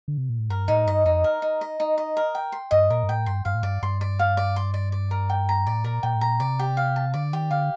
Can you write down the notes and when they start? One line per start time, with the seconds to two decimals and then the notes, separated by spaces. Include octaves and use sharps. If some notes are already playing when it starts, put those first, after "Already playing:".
0.08 D3
0.18 C3
0.29 A#2
0.39 A2
0.49 G2 A#4
0.68 A2 D#4
0.86 G2 D#5
1.05 F2 D#4
1.24 A#4
1.42 D#4
1.61 D#5
1.80 D#4
1.98 D#5
2.17 A#4
2.35 G5
2.52 C6
2.71 G2 D#5
2.90 A#2 A#4
3.03 G2
3.09 A2 G5
3.26 G2 C6
3.45 G2 F5
3.55 A2
3.63 G2 D5
3.82 G2 C6
4.01 D5
4.19 F5
4.37 D5
4.56 C6
4.74 D5
4.92 D5
5.11 A#4
5.30 G5
5.49 A#5
5.67 A2 D5
5.84 A#2 A#4
6.03 A#2 G5
6.15 A2
6.21 A#2 A#5
6.40 C3 D5
6.59 G4
6.77 F5
6.96 A5
7.14 D3 D5
7.33 D#3 G4
7.51 D3 F5